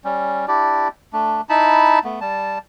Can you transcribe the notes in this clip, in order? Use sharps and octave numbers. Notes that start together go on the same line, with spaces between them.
G3 C#4
D4 E4 G4 D5
A3 D4
D#4 E4 A5 B5
A3 B3
G3 A5